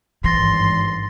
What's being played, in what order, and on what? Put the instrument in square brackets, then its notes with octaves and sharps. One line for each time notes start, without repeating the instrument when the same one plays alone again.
[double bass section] G#1 G2 [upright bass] E3 [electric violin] C6 [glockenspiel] A6 A#6 C7